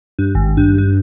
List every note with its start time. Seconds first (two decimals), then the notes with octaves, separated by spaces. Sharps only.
0.19 G2
0.35 G#1
0.57 G2
0.78 G2